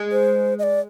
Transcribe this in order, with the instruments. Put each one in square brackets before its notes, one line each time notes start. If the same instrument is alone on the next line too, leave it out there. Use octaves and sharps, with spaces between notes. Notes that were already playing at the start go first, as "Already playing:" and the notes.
Already playing: [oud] G#3
[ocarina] C5
D#5
D5